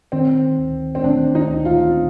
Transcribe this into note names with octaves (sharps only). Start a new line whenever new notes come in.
D#3 C4
D2
C4
D#3 D4
D#4
D2
F4